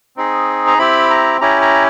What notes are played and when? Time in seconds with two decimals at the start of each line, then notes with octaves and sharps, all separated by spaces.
0.17 C4 D#4 G#4
0.67 A#5
0.78 C4 E4 G4 B5
1.10 A#5
1.41 C#4 E4 G4 A#5
1.61 A#5